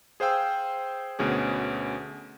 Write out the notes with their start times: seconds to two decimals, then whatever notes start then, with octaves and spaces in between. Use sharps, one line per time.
0.20 G#4 C5 F5 G5 E6
1.19 D2 B2 C#4 G#4